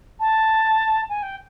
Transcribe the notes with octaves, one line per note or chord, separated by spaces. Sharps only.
A5
G#5
G5